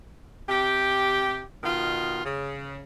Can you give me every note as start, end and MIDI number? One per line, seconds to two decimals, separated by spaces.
0.48 1.41 48
0.48 1.41 67
1.64 2.23 47
1.64 2.23 51
1.64 2.23 65
2.24 2.82 49